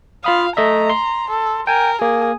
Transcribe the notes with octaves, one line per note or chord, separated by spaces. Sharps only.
F4 F5 B5 D#6
A3 D#5 E5 A#5
C6
A4
A#4 G5 G#5
A#3 G#4